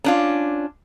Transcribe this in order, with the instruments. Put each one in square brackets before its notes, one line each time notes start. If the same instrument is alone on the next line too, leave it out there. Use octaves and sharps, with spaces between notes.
[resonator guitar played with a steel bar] C#4 D4 F4